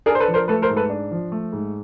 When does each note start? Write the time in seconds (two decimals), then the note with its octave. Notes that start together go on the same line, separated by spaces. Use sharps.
0.06 D4 G#4 A#4
0.15 C5
0.20 A4 B4
0.28 F3
0.34 A#4 C5
0.48 A3 A4 B4
0.62 A#4 C5
0.69 G#2
0.76 A4 B4
0.90 D4
1.11 F3
1.32 A3
1.52 G#2